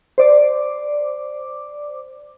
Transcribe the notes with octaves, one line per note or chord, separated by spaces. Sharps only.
C5 D5 D6